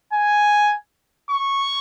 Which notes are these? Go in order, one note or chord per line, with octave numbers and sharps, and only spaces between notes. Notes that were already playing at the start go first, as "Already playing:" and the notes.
G#5
C#6